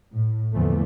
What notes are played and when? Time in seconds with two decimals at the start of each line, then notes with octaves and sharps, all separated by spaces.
0.14 A2
0.52 E2 A#2 D3 E3 F3 A3